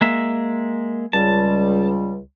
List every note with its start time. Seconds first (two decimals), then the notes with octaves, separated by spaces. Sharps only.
0.01 G#3 A#3 E5
1.13 C#2 G3 A5